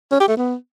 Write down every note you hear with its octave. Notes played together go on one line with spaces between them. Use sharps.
C#4
G4
A3
B3